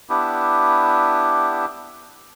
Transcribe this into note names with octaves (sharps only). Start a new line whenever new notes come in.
B3 D4 E4 G4